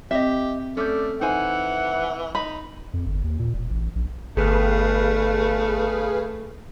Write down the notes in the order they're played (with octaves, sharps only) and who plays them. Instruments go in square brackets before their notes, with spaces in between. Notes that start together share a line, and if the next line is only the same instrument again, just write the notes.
[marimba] C4 [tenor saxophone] G4 [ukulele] D#5 E5
[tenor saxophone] A3 [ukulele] C#4 [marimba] A4 D6 G6 [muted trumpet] D5
[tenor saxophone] E3 [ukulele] D#4 C5 G#5 [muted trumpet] F#5
[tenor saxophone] D#4 [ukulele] B5
[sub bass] F2
G1
D#2
A#2
E1
A1
A#1
[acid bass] G1 [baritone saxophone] A3 [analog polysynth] G#4 B4 F5